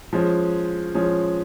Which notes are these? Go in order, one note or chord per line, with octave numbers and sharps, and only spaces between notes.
F3 G#3 C#4
F3 G#3 C#4